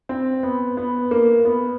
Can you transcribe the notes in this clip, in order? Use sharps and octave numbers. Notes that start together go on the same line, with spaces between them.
C4
B3
B3
A#3
B3